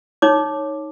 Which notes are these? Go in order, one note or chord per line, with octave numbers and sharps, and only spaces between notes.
D#4 C#5 D6